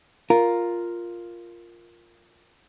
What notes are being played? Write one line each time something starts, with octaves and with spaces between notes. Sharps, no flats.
F4 A#4